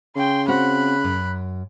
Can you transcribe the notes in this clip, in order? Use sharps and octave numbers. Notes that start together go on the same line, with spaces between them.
C#3 G5 C6
C4 F#4 F#5 B5 F#6
F#2